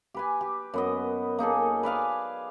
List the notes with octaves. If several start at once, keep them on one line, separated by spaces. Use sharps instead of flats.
G4 B4 G#5
G4
F#2 B3 D#5
A#3 D#4 G#4 A4
B4 D5 F5 G#5